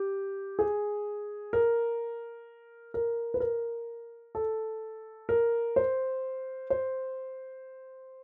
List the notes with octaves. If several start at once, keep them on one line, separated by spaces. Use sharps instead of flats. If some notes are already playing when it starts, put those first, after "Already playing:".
Already playing: G4
G#4
A#4
A#4
B4
A#4
A4
A#4
C5
C5